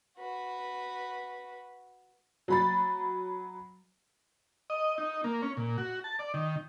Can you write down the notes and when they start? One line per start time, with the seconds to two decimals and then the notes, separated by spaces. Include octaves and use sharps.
0.18 F#4 B4
2.48 F#3 B5 A6
4.70 D#5
4.98 D#4
5.24 A#3
5.42 C#4
5.57 A#2
5.78 F#4
6.04 A5
6.19 D5
6.34 D#3